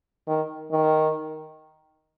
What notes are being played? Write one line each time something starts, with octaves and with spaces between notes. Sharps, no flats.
D#3
D#3